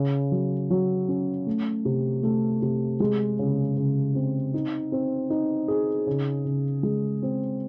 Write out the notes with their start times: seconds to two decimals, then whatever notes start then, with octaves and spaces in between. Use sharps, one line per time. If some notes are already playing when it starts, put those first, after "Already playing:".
Already playing: C#3
0.32 F#3
0.70 F#3
1.08 C#4
1.47 A3
1.85 C3
2.23 A3
2.62 C3
3.00 G#3
3.39 C#3
3.77 C#3
4.15 C4
4.54 D#4
4.92 C4
5.30 D#4
5.68 G#4
6.07 C#3
6.45 C#3
6.83 G#3
7.22 C4